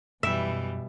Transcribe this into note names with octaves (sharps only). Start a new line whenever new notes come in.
F#2 B2 E3 G3 E5